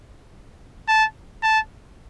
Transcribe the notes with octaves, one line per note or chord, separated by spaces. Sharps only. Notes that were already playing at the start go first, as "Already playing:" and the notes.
A5
A5